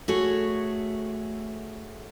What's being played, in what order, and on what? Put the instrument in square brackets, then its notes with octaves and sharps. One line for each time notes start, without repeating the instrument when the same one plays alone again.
[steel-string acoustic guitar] A3 F#4 G#4 C#5